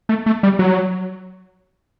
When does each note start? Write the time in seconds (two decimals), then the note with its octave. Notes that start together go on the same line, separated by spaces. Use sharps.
0.09 A3
0.26 A3
0.43 G3
0.59 F#3